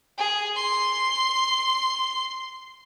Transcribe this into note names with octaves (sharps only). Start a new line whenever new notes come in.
G#4
C6